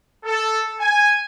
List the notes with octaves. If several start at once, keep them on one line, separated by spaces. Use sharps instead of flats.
A4
G#5